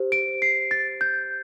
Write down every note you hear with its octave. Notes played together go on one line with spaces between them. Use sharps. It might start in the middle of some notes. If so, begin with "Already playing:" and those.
Already playing: G4 C5
D7
C7
A6
G6